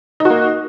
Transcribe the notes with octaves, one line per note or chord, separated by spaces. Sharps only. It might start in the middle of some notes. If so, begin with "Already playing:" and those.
A#3 D#4 F#4